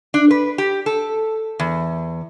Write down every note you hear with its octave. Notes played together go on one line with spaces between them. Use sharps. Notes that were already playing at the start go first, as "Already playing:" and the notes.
D4
B4
G4
A4
E2